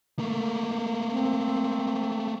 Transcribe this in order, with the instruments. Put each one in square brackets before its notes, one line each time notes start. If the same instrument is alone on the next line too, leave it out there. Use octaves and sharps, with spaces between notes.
[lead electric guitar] A3 A#3
[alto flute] C4